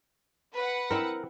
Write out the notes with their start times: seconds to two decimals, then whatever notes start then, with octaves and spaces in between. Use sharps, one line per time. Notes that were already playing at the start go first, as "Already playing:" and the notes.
0.54 B4 F#5
0.91 C4 E4 A#4